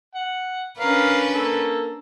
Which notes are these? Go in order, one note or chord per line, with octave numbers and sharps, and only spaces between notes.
F#5
C#4 D4 A#4 B4 F5
A#3 A4